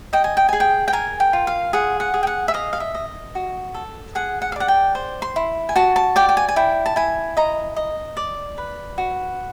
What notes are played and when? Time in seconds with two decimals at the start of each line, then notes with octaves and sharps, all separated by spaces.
0.13 D#5 G5
0.24 G#5
0.37 G5
0.49 G#4 G#5
0.60 G5
0.88 G5
0.93 A#4 G#5
1.20 G5
1.33 F4
1.47 F5
1.73 G#4 F#5
2.00 F#5
2.14 G#4
2.23 G5
2.27 F#5
2.48 E5
2.54 D#5 F5
2.73 F5
2.80 E5
2.95 D#5
3.35 F#4
3.74 A4
4.15 G#4 F#5
4.42 F#5
4.52 F5
4.56 D5 F#5
4.68 G5
4.95 C5
5.22 C6
5.36 E4
5.69 G#5
5.76 F#4 A5
5.96 A5
6.16 D5 G5
6.29 G5
6.37 G#5
6.49 G#5
6.56 E4 G5
6.86 A5
6.96 E4 G#5
7.37 D#5 A#5
7.76 D#5
8.17 D5
8.58 B4
8.98 F#4